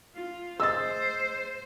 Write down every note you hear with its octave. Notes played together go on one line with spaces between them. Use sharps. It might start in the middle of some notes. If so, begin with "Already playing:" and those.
F4
G#4 C5 D#5 E6 A6